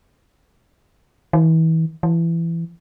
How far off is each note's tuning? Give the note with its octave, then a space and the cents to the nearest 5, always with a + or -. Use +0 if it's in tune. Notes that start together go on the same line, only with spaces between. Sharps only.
E3 -35
E3 +20